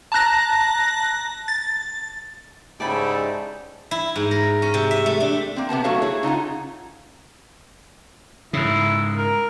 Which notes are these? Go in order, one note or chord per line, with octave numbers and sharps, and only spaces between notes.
A5 A#5 F#6 A#6
A6
G#2 C#3 E4 G4 A4 D5 G#5 B5
E4
G#2
A#4
C#4
C3
E5
A3
D4
A#3 C4
C3 B3 C4 A5
F#3 A3 F#4 A4 C#5 F5
E4 G#4 C#5
C#3 D#4 F4 F#5
G#2 C#3 E4
A#4